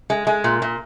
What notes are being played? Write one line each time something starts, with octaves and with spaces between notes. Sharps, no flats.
G#3
G#3
A#2
A#2